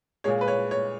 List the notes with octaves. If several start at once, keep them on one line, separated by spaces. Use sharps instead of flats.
A#2 G#3 C#5
B4
C#5
C#5